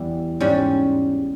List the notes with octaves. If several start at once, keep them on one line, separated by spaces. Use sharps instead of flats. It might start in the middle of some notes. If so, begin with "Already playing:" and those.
Already playing: E2 E3 G3
G#2 G3 C#4